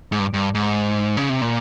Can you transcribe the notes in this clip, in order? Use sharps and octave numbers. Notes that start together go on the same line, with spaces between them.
G#2
G2
G2
G#2
C#3
C3
A#2